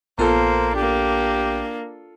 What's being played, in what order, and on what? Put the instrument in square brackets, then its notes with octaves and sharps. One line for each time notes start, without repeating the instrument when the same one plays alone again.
[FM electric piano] A#1 B3 A#4 [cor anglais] A#3 [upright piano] F4 A4 [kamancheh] C5
[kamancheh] A#3 D4 [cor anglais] G4